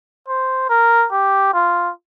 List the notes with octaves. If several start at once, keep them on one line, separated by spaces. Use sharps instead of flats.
C5
A#4
G4
F4